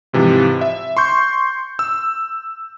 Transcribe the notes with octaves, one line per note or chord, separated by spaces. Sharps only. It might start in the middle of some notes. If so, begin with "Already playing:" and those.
G#2 C3 E3 F3
E5
C6 C#6 G6
E6